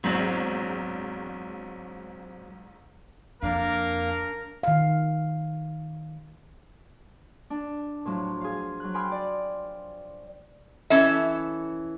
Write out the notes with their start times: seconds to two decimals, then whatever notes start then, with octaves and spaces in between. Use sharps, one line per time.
0.04 A#1 E2 G#2 F#3 C4
3.42 F2 A#3 D4 A#4 F5
4.63 D#3 F5
7.50 D4
8.05 A2 F3 F#3
8.41 G#4 F5
8.80 F#3 F#6
8.94 G5 G#5 B5 C6 D#6 F6
9.12 D5
10.90 E3 C#4 A4 E5